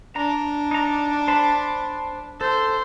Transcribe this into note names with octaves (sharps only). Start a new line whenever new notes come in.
D4 A#5
D#4 A#5
C5 A5 B5
A4 C5